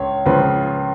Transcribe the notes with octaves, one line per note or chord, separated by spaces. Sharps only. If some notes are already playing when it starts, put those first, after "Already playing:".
Already playing: C#2 C#3 C#5
C#2 C#3 F3 B4